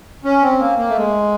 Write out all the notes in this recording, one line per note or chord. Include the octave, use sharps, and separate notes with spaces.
C#4
C4
A#3
A#3
A3
G#3